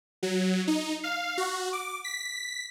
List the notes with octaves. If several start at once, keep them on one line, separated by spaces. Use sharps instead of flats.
F#3
D#4
F5
F#4
D6
B6